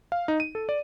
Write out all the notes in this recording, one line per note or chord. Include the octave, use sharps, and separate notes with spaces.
F5
D#4
D#7
A4
D5